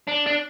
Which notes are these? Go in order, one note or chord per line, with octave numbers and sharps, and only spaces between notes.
D4
D4